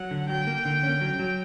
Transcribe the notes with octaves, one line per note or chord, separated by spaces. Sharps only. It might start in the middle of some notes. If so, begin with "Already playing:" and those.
Already playing: F#3 F#5
D3
F#3 G5
A#3
D3
C#4
F#3
F#3